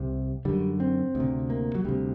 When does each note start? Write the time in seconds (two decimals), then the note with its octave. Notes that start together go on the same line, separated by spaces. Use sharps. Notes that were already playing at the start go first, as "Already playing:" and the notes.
Already playing: C2 C3
0.45 F#2 D3 G3
0.80 C4
1.15 D2
1.20 C3
1.50 A#3
1.75 F#3
1.85 D2 C3 G3